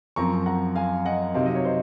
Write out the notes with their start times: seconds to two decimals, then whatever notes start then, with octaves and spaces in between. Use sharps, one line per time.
0.16 F#2 F3 C4 A#5 C#6
0.46 F#5 A#5
0.75 F5 G#5
1.05 D#5 F#5
1.34 C3 F#3 C4 D#4 F5
1.46 D#5
1.55 C#5
1.65 C5 D#5